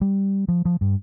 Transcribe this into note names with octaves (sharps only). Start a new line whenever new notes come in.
G3
F3
F3
G2